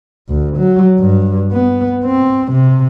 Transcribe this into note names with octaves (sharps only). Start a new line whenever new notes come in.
D2
F#3
G2
B3
C4
C3